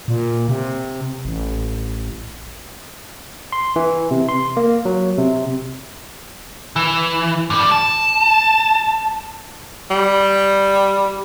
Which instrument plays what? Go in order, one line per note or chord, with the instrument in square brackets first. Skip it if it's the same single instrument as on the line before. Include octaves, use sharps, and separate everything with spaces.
[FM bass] A#2
C3
A1
[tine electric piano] C6
E3
C3
C6
A#3
F#3
C3
[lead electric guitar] E3
G2 G3
A5
[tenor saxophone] G3